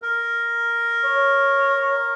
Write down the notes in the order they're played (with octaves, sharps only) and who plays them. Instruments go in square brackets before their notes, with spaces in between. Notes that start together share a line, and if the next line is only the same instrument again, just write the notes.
[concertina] A#4
[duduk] C#5